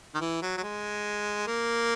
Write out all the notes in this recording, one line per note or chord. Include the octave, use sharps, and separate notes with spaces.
D#3
E3
F#3
F#3
G#3
A#3